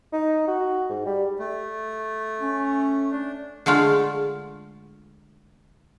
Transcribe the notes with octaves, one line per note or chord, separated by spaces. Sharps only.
D#4
F#4
G#2
G3
A3
C#4
D4
D3 G#3 A3 F4